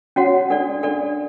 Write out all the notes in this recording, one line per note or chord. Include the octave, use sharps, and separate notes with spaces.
C#4 F#4 C#5 F#5
D4 A4 D5
D4 A4 D5